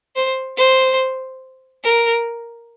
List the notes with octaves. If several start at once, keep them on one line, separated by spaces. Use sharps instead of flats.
C5
C5
A#4